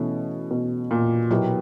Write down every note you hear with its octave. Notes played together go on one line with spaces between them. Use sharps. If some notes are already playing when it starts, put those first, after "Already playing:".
Already playing: B2 E3 A3 C#4 E4 A4
B2
A#2
B2 F#3 B3 E4 G4 A#4